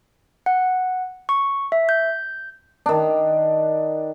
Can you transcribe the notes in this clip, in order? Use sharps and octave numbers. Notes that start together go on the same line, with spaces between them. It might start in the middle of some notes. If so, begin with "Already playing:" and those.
F#5
C#6
E5
G6
D#3 D4